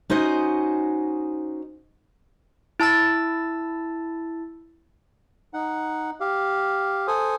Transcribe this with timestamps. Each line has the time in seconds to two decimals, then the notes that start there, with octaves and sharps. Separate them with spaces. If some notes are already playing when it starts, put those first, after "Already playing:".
0.10 C#4 D#4 F#4 C5 D#5
2.80 E4 A5 E6 A6
5.54 D#4 F#5
6.20 G4 F5
7.07 A4 C5 G#5 D#6